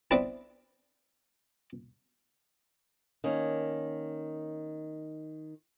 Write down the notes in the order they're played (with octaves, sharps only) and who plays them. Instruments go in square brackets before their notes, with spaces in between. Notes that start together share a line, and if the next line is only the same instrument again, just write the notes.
[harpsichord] B3 C4 D4 E4 B4 A5
[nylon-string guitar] D#3 A#3 C#4